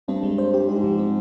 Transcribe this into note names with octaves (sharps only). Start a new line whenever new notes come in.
G2 C4
G#3
C5
G4
G#2 G4
F3
C4